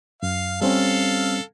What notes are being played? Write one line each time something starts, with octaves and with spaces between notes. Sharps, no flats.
F#2 F5
G3 C4 C#4 A4 F5